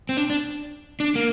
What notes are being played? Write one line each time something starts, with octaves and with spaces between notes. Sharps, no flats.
C4
D4
D4
D4
A#3